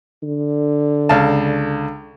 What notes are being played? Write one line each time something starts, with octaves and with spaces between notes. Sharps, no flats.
D3
C#2 F5 A5